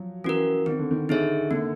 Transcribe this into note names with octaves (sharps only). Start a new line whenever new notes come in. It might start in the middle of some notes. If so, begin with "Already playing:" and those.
Already playing: F3 F#3
E3 C#4 F#4 A#4
D#3 C4
D3
D#3
D3 D#4 G#4 C#5 E5
D3 A#3